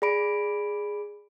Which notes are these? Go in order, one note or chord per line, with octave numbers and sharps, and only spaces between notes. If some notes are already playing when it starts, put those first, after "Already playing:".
G#4 D5 B5 D7